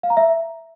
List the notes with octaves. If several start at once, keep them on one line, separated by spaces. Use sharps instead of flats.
F5
A#5
E5